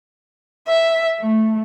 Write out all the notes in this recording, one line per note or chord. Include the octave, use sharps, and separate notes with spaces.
E5
A3